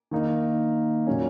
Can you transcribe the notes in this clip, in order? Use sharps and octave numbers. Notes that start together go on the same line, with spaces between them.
D#3 A#3 D#4
A#2 F#3 C#4